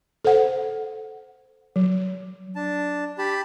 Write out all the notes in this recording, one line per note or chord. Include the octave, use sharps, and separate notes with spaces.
A4 C5 F#5
F#3
D4 A5
G4 A5 B5